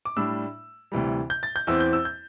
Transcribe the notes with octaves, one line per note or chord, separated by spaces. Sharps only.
D6
A2 G3 D4 E6
D2 C3 E3 G3
G6
A6
G6
E2 E3 C4 E6
G6
E6
G6